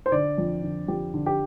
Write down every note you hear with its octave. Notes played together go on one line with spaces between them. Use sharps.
C5
D3 D5
F2
D3
F2 G4
D3
G4